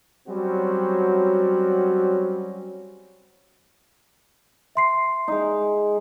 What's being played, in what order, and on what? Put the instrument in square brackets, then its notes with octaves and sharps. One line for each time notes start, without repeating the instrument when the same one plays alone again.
[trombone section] F#3 G3 C4 C#4 F#4
[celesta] E5 C6 C7
[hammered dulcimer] G#3 D#4